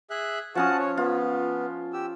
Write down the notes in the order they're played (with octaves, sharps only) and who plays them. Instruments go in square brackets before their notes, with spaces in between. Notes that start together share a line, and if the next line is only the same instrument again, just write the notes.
[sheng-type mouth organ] G#4 E5 F#6
[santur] F3 C#4 D#6 [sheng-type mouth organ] F#4 F#5 A5
[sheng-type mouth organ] C#5
[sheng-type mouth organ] B3 [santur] F4
[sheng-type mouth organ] G4 E6